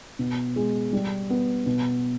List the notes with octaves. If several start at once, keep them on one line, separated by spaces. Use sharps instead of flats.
B2
G#3
G3
B3
B2